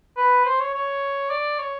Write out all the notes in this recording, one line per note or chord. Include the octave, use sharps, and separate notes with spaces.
B4
C5
C#5
C#5
D5
C#5